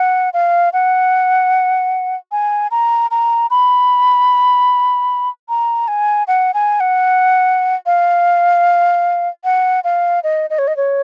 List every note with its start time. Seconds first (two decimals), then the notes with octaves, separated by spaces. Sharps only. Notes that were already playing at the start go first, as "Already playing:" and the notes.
Already playing: F#5
0.34 F5
0.73 F#5
2.32 G#5
2.71 A#5
3.11 A#5
3.51 B5
5.49 A#5
5.88 G#5
6.28 F#5
6.54 G#5
6.80 F#5
7.86 F5
9.44 F#5
9.84 F5
10.24 D#5
10.50 D#5
10.59 C#5
10.68 D#5
10.77 C#5